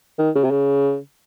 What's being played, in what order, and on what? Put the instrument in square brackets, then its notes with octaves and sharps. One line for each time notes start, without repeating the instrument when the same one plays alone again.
[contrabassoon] D#3
C#3
C3
C#3